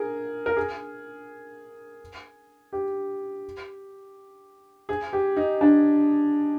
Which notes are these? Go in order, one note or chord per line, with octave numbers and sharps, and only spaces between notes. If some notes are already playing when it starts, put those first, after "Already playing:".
Already playing: G#4 A#4
A#4
G#4
G4
G#4
G4
D#4
D4